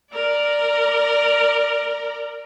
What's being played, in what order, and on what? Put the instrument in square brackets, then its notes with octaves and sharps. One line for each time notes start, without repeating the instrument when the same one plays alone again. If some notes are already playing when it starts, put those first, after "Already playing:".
[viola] A#4 D5